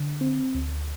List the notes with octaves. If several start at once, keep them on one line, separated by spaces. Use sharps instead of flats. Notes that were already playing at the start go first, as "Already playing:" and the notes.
Already playing: D3
C4
D2